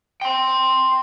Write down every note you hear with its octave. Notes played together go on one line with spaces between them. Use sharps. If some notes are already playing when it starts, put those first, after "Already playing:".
G5 C6